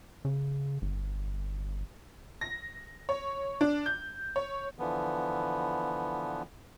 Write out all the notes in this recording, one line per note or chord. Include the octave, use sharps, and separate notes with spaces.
C#3
G1
A#6
C#5
D4
G6
C#5
D3 E3 F3 B3